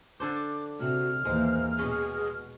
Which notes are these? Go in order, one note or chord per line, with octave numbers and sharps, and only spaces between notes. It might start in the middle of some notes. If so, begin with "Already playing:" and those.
D3 D4 C5 D6
C3 F#4 F6
D#2 E3 G#3 A#3 C5
B2 C#4 G#4